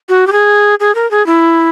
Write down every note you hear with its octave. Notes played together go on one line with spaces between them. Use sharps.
F#4
G4
G#4
G#4
A#4
G#4
E4